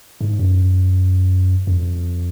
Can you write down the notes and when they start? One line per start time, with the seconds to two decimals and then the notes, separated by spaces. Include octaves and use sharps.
0.21 G#2
0.39 F#2
1.67 F2